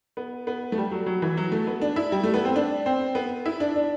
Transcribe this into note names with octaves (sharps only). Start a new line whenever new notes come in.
B3
B3
A3
G3
F#3
F#3
E3
F#3
A3
B3
D4
E4
G3
A3
B3
C4
D4
C4
B3
E4
D4
D4